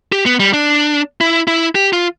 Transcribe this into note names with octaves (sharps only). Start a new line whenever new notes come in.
G4
B3
G3
D4
E4
E4
G4
F4